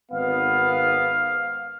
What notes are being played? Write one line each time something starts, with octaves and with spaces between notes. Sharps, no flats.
G#1 B3 F5